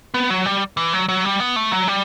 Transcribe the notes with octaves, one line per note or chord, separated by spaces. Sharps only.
B3
F#3
G3
E3
F#3
F#3
G3
B3
A3
F#3
G3